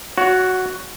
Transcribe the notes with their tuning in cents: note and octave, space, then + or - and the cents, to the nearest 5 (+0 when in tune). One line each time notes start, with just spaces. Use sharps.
F#4 +0 C#5 +35